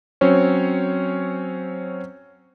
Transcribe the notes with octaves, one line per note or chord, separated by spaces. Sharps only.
F#3 C4 C#4 C5 C#5